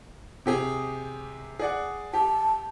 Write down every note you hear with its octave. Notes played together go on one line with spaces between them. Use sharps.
C3 G4 G#4
G#4 D5 F#5
G4 A5